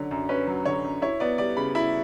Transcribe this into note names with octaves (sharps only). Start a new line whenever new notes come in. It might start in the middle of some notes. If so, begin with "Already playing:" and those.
Already playing: D3 F#3 C#4
F#2
C#4 B4
F#3
D3 C#5
F#2
E4 C#5
B3 D5
G3 D5
C#3 B5
E4 B5